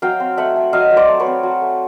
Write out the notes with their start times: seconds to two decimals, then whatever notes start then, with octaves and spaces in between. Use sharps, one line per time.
0.02 F#3 F5 G5
0.20 C4
0.38 A3 E5 F#5
0.56 A3
0.73 F#3 D#5 F5
0.91 F#3
0.96 C5 D5
1.08 A3
1.20 B4 C#5
1.26 C4
1.43 F#3
1.62 A3